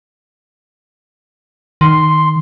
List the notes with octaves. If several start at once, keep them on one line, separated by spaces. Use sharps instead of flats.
D#3 C6